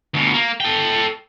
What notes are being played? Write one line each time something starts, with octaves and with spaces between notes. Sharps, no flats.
D2 B2
A#3
A4 G5